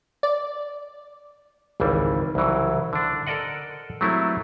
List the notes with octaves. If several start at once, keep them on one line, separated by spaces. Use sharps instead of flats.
D5
G#1 C#2 E3 G3
C2 C#3 E3 F#3
D3 D4
A4 A#4 D5 D#5 F#5
F#3 G3 A3 A#3 C4 E4